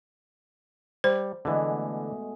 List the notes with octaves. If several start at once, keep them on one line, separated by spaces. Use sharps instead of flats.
G3 C5
B2 D3 E3 G#3 A3